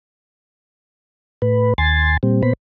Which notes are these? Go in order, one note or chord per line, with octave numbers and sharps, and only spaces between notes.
A2 B4
D#2 G#5 C6 A6
A#2 G3 C4
A#2 B3 C5 B5